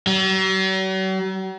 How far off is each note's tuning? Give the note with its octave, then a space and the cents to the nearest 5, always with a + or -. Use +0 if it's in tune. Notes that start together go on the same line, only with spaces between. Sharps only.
F#3 +45